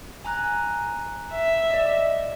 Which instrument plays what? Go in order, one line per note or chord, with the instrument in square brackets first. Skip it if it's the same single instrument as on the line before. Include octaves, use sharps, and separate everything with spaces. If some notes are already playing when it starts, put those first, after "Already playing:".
[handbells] G#5 A#5 F#6
[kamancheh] E5
[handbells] D5 D#5